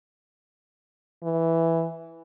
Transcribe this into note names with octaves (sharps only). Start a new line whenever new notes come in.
E3